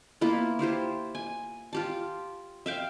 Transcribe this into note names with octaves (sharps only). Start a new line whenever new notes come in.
A#3 B3 E4 F4
E4 F4 G4 C5
G#5
F4 G4 A5
E5 F5 G5